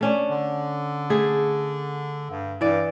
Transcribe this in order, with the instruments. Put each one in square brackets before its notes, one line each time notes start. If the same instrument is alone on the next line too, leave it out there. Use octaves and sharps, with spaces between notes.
[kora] A3 C#4 D4
[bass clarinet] D3
[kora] A3 G#4
[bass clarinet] G2
[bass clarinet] G2 [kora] E3 D5